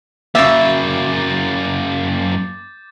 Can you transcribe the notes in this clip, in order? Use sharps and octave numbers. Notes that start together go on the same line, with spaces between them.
F#2 C#3 A#3 E5 D6 G6 A6